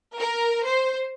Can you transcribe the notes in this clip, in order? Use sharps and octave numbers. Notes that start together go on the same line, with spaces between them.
A#4
C5